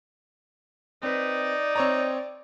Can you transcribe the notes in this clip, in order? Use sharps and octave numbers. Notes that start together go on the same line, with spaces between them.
C4 D#4 B4 D5
C4 C#5 A#5